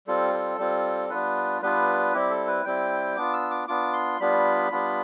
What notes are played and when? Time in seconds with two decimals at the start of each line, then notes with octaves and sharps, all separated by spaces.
0.07 G3 C4 F4 A4
0.33 A4
0.58 G3 C4 F4
1.10 G3 B3 D4 F4 B4
1.62 G3 B3 D4 F4 B4
2.13 G3 C4 E4 G4
2.30 A4
2.47 B4
2.65 G3 C4 E4 G5
3.16 B3 D4 F4 D6
3.33 E6
3.51 D6
3.68 B3 D4 F4 D6
3.93 C6
4.20 G3 B3 D4 F4 B5
4.71 G3 B3 D4 F4